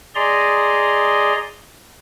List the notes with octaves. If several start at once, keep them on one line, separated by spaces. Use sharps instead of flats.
G#4 D5 D#5 A#5 C6